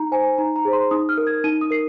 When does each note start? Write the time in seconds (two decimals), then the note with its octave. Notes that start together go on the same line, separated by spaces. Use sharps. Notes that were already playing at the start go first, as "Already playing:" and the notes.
Already playing: D#4 A#5
0.12 C5 G#5
0.38 D#4 A#5
0.56 A#5
0.65 G#4 C5
0.73 C6
0.91 D#4 D#6
1.09 F6
1.18 A#4
1.27 G#6
1.44 D#4 D#7
1.61 D#6
1.71 A#4 C7